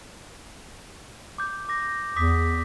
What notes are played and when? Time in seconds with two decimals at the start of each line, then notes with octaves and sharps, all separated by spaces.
1.38 D6 G6
1.69 D6 A#6
2.16 E2 D6 D#6 B6